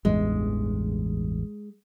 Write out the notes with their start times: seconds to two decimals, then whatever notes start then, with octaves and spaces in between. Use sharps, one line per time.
0.05 A1 E2 G2 G#3